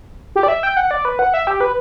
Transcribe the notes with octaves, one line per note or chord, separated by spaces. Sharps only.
G4
D5
E5
G5
F#5
D5
B4
F#5
E5
G4
B4